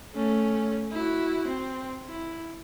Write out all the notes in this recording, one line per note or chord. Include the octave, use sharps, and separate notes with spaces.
A3 C#4
E4 F#4
C4
E4